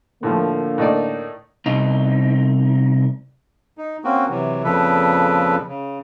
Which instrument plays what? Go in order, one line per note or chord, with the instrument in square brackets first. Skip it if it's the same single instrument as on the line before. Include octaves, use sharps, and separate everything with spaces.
[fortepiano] A2 F3 [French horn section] D3 A#3 A#4
[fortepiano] A2 D#4 D5
[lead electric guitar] C2 D#4
[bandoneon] D#4
A#3 C4 C#4 F#4
C3 E3 F#3
F2 A#2 C#3 F3 A4 B4
C#3